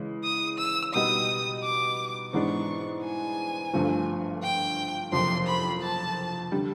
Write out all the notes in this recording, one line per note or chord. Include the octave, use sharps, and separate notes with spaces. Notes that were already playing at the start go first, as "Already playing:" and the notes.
Already playing: C#3 E3 G#3
D#6
E6
B2 G3 B3 D#4 D#6
D6
G#2 E3 G#3 B3 D4 C#6
G#5
G1 G2 D3 F3 A3
G5
F#1 F2 C3 C6
B5
A5
D3 G3